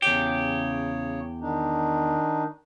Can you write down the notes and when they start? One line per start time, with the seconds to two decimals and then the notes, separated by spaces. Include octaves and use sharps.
0.02 E2 C#3 G4 C#5
1.41 D#3 D4 D#4